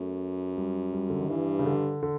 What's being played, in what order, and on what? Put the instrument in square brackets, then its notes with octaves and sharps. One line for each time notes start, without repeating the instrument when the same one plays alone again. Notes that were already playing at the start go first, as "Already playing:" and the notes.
Already playing: [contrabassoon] F#2 [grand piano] A3
[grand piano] G3
G3
D3
D#3
[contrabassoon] G2 [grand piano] E3
[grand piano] C#3
D3
D3